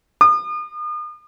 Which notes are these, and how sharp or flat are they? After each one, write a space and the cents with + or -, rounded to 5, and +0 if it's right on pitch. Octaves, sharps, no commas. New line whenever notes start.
D#6 -40